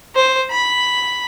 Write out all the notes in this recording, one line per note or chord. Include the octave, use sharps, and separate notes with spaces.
C5
B5